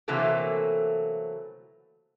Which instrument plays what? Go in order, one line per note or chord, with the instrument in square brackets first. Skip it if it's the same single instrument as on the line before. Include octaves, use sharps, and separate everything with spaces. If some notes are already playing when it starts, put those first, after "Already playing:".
[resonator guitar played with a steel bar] C3 E3 F#3 A3 A#3 A4